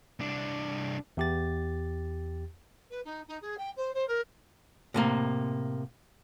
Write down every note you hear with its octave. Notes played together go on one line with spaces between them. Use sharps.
C2 D4
E2 G4 A6
B4
D#4
D#4
G#4
G5
C5
C5
A#4
A2 C3 A#3